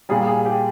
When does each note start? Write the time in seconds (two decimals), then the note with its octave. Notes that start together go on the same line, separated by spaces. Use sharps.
0.09 A#2 G3 G#4
0.27 G#4
0.46 G4